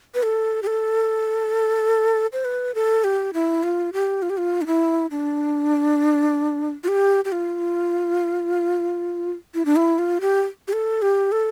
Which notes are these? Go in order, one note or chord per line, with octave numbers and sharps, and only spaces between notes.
B4
A4
G4
A4
C5
B4
A4
G4
E4
F4
G4
F4
G4
F4
D4
E4
D4
F4
G4
G4
F4
E4
D4
E4
F4
G4
G4
A4
G4
A4